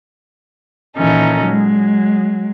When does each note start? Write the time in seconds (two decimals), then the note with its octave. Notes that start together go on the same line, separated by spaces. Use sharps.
0.98 A#2 D#3 E3 C#4 D#4 A4
1.46 F#3 G#3